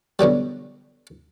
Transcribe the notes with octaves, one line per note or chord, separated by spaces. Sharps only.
B2 D3 F#3 G3